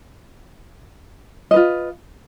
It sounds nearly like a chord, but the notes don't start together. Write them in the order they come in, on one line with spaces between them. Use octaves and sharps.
D#5 B4 F4